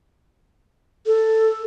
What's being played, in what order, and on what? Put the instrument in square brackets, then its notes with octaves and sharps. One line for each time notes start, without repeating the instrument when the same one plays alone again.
[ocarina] A4